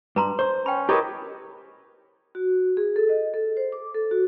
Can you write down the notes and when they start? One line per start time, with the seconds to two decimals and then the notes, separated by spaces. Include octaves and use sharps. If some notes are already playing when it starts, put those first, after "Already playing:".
0.16 G2 B4 A#5 C6
0.39 C5
0.66 C#4 G5 B5
0.89 E4 G4 A#4 B4 C#5 D#5
2.35 F#4
2.77 G#4
2.96 A4
3.09 D#5
3.34 A4
3.57 C5
3.72 D6
3.94 A4
4.11 F#4